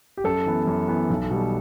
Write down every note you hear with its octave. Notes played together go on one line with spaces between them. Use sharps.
G4
F#2 A4
E3 B3
F#2
E3 B3
B1
B2 G3 B3